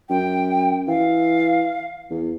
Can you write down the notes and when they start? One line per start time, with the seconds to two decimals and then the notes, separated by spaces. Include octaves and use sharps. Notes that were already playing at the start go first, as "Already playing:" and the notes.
0.10 F#2 G5
0.88 E3 F5
2.10 E2